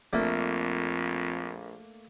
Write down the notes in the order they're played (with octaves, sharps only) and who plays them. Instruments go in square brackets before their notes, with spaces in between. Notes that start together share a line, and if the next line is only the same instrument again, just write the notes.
[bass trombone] A#1 [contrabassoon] F2 [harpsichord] A3 A#3 D4